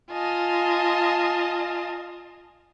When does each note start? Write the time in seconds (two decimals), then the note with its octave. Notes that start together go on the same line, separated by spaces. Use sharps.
0.11 F4 D#5 G#5 A5